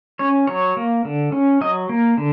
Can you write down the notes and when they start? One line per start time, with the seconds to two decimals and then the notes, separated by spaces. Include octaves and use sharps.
0.19 C#4 C#5
0.47 F#3 C#5
0.77 A#3
1.05 D3
1.32 C#4
1.61 F#3 D#5
1.89 A#3
2.17 D3